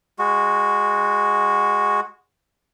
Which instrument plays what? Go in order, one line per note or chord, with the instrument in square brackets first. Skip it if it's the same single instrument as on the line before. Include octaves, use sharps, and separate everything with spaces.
[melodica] G#3 F#4